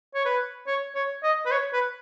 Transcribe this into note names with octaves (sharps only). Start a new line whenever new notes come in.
C#5
B4
C#5
C#5
D#5
B4
C#5
B4